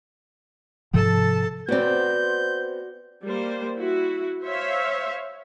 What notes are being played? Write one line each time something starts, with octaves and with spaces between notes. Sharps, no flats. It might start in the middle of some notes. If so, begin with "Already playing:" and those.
G#2 C3 F3 A4 A5
B3 C4 F#4 C5 D5 G6
G3 A#3 C5
E4 F#4
C5 C#5 E5 F5